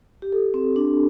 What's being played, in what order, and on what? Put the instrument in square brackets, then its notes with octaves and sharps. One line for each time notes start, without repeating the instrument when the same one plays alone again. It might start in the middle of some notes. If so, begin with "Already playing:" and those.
[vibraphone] G4
A4
C4
D4